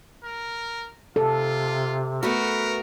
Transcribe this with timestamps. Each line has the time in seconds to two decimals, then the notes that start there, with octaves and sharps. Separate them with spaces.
0.24 A#4
1.16 C3 F4 A4
2.23 A3 B3 F#4 A#4 B4